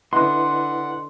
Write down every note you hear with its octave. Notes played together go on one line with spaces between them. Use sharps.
D3 E4 B4 D#5 F#5 C6 F#6